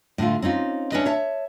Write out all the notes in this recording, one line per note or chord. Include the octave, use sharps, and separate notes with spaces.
A2 D3 A3 F4
C4 C#4 D#4 F4
C#4 D4 E4 B4 D#5
C#5 E5 A5